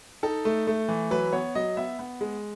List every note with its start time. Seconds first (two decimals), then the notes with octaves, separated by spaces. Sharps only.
0.23 D#4 A4
0.45 A3
0.67 A3
0.88 E3
1.11 F#3 B4
1.33 B3 C#5
1.55 F#3 D#5
1.77 B3 E5
1.99 B3
2.21 G#3